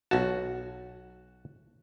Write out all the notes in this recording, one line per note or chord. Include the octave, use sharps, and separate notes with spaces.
B1 F#4 A5